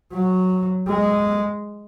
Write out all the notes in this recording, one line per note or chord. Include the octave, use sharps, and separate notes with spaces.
F#3
G#3